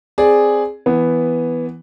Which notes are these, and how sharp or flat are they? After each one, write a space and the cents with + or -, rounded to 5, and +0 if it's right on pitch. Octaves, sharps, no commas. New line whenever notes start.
C4 +0 G#4 +0 D5 +0
E3 +0 B3 +0 F#5 +5